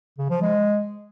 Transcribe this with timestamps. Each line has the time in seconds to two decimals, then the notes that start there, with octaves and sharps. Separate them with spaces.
0.18 C#3
0.30 F3
0.42 G#3